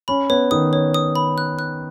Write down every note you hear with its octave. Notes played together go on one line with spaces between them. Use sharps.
C#4 B5
B3 C#5
D#3 D#6
C#5
D#6
B5
F#6
F#6